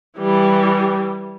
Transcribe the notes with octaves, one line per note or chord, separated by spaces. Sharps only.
E3 G3